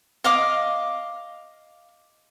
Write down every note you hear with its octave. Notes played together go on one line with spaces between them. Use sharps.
D#5 F5 D6